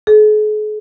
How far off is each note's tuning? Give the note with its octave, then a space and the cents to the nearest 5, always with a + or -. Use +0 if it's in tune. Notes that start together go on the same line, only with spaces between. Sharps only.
G#4 +45